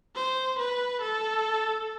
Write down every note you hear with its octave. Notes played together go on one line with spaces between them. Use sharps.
C5
B4
A4